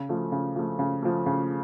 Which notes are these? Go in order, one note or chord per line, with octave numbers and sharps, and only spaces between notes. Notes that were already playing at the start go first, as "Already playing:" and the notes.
Already playing: C#3
F3 A3
C#3
F3 A3
C#3
F3 A3
C#3